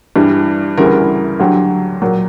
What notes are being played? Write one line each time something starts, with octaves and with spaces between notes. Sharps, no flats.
G2 E3 G3
D2 C#3 E3 G3 A#4
B4
A#4
D2 D3 F#3 G4
A#2 F#3